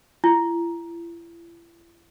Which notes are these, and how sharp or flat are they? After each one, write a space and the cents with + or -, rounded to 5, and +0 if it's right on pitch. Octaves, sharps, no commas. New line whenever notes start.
E4 +40